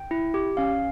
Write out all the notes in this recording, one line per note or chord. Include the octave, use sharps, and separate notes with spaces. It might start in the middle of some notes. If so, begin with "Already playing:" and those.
Already playing: G5
E4
G4
C#4 F5